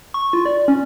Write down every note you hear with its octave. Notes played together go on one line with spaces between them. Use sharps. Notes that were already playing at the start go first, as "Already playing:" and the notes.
C#6
F4
D5
C#4